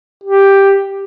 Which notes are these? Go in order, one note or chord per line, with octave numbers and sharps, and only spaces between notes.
G4